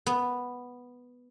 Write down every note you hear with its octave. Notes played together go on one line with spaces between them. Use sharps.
B3